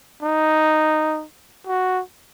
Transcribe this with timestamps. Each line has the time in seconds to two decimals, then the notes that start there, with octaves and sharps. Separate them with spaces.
0.22 D#4
1.67 F#4